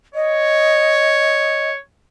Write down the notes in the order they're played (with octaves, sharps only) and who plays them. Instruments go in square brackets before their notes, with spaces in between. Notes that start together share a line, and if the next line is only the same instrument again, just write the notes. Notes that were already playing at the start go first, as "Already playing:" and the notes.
[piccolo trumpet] C#5 [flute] D#5